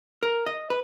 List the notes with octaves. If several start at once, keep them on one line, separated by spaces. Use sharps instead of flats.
A#4
D#5
B4